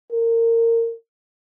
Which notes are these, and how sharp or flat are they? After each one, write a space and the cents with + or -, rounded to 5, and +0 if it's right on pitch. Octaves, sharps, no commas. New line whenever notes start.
A#4 -25